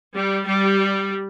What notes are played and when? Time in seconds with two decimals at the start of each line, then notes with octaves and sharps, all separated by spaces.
0.15 G3
0.46 G3